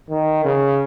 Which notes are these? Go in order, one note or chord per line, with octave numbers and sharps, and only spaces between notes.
D#3
C#3